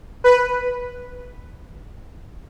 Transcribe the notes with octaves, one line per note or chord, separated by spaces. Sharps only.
B4